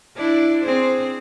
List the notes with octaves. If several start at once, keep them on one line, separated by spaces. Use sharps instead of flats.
D4 E4
C4 G#4 C5